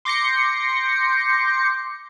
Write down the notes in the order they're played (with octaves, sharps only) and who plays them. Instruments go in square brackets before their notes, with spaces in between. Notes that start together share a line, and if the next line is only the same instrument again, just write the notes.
[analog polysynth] C6 D6 G6 A#6 C7 C#7